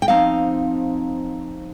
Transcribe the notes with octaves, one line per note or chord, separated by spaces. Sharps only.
G5
F3 C4 D#4 F5